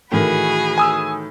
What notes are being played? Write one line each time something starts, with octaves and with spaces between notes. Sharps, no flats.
A2 D#3 E3 F#4 G#4 B5
G#5 D#6 E6